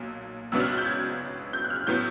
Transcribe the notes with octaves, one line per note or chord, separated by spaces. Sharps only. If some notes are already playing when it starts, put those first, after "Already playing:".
Already playing: B1 A#2 F#3
C#2 B2 F#3 B3 D4 E6
F6
F#6
G6
G#6
G6
F#6
F6
F#6
A2 F#3 B3 G6